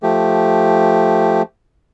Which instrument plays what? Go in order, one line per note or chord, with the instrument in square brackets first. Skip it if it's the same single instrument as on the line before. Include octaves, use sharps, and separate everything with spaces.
[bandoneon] F3 A3 G4